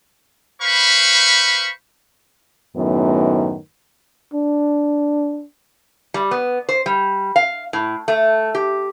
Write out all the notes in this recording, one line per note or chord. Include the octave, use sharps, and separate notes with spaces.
B4 C5 F5 B5 C#6
F#2 A2 D#3 B3
D4
G3
B3
C5
G3
F5
A2
A3
G4